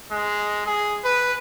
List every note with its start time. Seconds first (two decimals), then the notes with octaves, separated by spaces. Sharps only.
0.11 G#3
0.66 G#4
1.04 B4